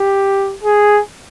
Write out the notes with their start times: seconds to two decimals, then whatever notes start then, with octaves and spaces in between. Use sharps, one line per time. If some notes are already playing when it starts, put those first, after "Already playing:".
Already playing: G4
0.64 G#4